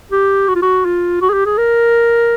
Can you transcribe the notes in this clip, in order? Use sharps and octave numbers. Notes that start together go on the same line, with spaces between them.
G4
F#4
F4
F#4
F4
F#4
G#4
G4
G#4
A#4